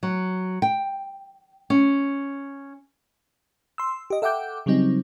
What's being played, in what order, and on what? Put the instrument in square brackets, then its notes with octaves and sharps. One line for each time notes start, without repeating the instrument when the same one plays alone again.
[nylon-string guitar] F#3
G5
C#4
[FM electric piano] C6 E6
G4 D#5
A4 E5 F#5 G5 D6 G6
C#3 F#3 G3 C4 D#4